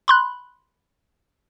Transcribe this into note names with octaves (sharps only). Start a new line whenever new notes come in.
B5 C6 F#6